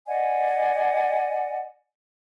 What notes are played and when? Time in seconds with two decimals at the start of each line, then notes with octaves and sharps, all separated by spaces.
0.07 D5 D#5 F#5 G#5